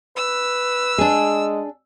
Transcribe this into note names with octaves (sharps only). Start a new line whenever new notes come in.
B4 E6
G#3 D4 G#4